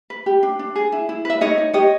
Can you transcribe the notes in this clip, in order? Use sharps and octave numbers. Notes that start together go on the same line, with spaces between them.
B4
G4
D4
D4
G#4
E4
E4
B4 E5
D#4 C#5 D#5
D#4
G4 C#5 D#5